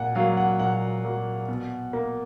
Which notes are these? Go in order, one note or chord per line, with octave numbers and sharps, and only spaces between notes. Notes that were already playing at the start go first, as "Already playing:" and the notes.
Already playing: A#2 F#5
F#3 A#3 F5
F#5
A#2 F#5
F#3 A#3
B2
A#3